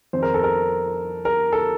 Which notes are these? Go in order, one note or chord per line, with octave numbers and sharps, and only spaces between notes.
F2 D#3 C5
A#4
A4
A#4
A#4
A4